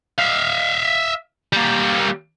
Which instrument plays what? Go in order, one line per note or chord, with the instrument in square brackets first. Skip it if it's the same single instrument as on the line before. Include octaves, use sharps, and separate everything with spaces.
[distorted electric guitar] E5 F5
G3 A#3